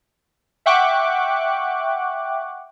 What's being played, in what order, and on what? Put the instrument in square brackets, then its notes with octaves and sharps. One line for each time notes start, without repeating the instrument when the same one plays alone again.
[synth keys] E5 F#5 G5 C#6 D6 F#6